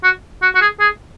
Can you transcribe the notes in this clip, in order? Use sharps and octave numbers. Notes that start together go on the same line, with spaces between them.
F#4
F#4
F#4
G#4
G#4